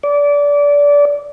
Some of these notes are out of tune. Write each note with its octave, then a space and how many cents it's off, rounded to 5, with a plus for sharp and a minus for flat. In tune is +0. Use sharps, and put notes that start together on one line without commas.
D5 -25